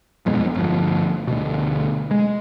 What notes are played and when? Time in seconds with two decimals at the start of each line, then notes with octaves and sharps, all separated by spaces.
0.26 D#1 F2 B2 G#3
0.55 G1 F3
1.27 D2 B2
2.11 G#3